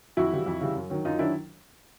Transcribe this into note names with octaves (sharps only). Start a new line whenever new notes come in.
F2 E4 F#4
C#3 E3 G3
F2
C#3 E3 G3
F#2
D#3 F#3
F#2 D#4 F4
D#3 F#3 D4 E4